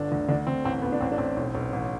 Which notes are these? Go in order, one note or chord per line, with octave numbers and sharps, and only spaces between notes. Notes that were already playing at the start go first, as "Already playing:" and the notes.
Already playing: G1 D3 D4
D2
D2 D4
D2 C4
A1 C4
A1 B3
D4
A1 C4
D4
A1 C4
B1
B1
A1